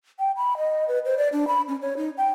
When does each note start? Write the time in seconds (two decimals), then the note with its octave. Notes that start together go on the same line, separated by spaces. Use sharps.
0.19 G5
0.37 B5
0.57 D#5
0.88 B4
1.05 C5
1.18 D5
1.33 D4
1.47 B5
1.68 C#4
1.82 C#5
1.97 D#4
2.18 G5